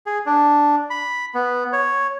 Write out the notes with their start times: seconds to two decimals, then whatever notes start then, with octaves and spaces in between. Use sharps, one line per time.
0.06 G#4
0.26 D4
0.90 B5
1.35 B3
1.73 C#5